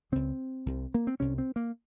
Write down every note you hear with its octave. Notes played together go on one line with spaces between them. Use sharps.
C#2 C#3 C4
C2 C3
A#3
C4
C2 C3 C#4
C4
A#3